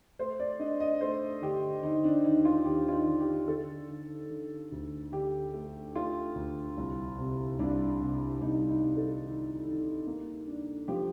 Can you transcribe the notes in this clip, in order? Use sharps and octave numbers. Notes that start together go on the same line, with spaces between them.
A3 C5
D5
D4 D#5
D#5
A3 C5
D3 G4
D3 D#4
D4
D#2 D#4
F4
D#2 G4
F4
D#4
D3
G4
D3 A4
D3
D3
D2
D3 G4
A3
A3 F4
D2
C2
C3
C2 D4
C3
C2 D#4
D#4
C2
A4
D#3
D#3
A#3
D4
F3 G4